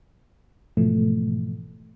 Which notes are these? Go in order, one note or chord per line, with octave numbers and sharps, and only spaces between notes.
G#2 B2 E3 F3 A3